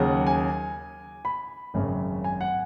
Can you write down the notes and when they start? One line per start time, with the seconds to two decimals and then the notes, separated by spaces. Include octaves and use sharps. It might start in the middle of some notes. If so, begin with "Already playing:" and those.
Already playing: D#2 C#3 F#3 F#5
0.27 G#5
1.25 B5
1.74 G#1 F#2 C#3
2.24 G#5
2.41 F#5